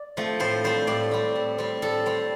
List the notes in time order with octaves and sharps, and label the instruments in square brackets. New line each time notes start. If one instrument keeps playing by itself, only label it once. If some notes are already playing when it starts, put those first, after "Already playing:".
Already playing: [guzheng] D5
F3 A3 C4
A2 C5
G3 C4 C5
A2 D5
G3 C4
A2
G3 C4
A2 A4
G3 C4